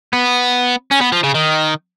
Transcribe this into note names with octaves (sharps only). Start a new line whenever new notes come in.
B3
C#4
B3
F3
C#3
D#3